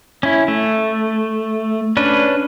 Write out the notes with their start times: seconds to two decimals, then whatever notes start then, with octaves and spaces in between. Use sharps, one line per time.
0.23 C#4 E4
0.48 A3
1.97 C#4 D4 B4